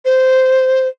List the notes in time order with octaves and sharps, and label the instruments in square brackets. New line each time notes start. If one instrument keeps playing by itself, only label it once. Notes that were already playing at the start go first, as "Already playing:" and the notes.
[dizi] C5